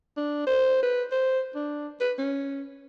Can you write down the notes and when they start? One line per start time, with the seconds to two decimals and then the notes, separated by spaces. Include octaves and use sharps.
0.17 D4
0.47 C5
0.83 B4
1.12 C5
1.55 D4
2.01 B4
2.18 C#4